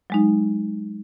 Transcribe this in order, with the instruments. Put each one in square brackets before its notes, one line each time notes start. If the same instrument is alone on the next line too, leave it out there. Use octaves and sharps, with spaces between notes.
[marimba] F#3 G#3 D#4